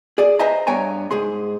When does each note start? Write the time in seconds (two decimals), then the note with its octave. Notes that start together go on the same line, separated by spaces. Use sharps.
0.18 G#4 D5
0.39 B4 C5 D#5 E5 G#5 A#5
0.67 G2 B3 C#5 G5 G#5 A#5
1.11 G#2 G#4 C6